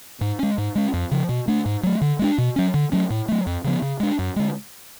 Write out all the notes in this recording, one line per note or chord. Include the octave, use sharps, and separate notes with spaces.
G#2
G#3 C#4
G#2
G#3 C#4
F2
C#3 F3
B2
A3 D4
G#2
F#3 A3
D3
G#3 B3 D4
B2
F#3 C#4
D3
F#3 A3 C#4
A2
F#3 A3
F2
C#3 F3 B3
C#3
G#3 D4
F#2
D3 G#3